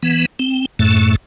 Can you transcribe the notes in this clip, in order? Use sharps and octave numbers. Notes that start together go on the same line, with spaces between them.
E3 B3
C4
F#2 A2 A3